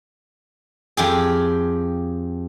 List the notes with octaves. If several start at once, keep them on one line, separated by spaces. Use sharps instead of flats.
F2 G4 G#4